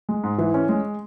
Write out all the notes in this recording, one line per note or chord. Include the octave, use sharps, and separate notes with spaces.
G#3
G#2
E3
C#4
G#3